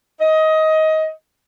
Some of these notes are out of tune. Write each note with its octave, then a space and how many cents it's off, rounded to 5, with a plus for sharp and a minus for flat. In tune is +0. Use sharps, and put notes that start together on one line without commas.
D#5 +20